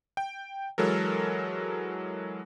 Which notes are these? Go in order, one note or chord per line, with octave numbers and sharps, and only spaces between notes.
G5
E3 F#3 G#3 A4 A#4